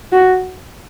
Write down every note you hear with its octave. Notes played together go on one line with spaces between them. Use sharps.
F#4